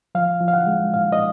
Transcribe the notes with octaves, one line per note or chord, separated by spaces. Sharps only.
F3 F5
F3
F5
F#5
G#3
A#2 F5
D#5